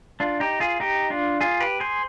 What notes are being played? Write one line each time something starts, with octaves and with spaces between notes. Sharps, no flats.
D4 F4
D#4 G4
F4 G#4
D#4 G4
D4 F4
F4 G#4
G4 B4
G#4 C5